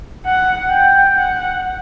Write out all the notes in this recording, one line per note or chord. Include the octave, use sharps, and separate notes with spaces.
F#5
G5
F#5